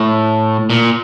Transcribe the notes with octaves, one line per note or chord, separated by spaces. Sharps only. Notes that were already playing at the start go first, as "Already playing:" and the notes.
Already playing: A2
A#2